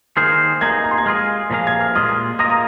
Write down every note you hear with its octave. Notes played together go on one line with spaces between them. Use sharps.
D#3 A#3 G#4 C5 F6
A#3 D#4 G#4 G#6
A#5
C6
G#6
G#3 F4 G#4 F6
A#2 F3 A#3 G#4 F5
G#6
F6
A#2 G#3 F4 D#6
A#3 F4 A#4 D#5 D#6
A#5